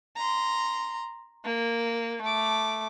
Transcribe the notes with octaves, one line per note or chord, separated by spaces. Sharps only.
A#5 C6
A#3
A3 D6